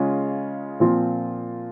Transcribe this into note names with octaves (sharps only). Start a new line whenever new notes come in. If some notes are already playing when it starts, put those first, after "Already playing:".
Already playing: C#3 G#3 C#4 F4
A#2 F3 C4 F4